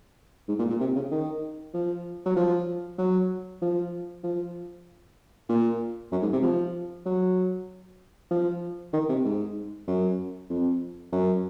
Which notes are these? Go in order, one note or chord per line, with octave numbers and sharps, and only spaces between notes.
G#2
A#2
A#2
C3
C#3
D#3
F3
F#3
F3
F#3
F3
F3
A#2
F#2
G#2
C3
F3
F#3
F3
D#3
C3
G#2
F#2
F2
F#2